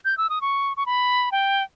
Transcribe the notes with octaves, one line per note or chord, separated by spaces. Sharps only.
G6
E6
D#6
C#6
C#6
B5
G5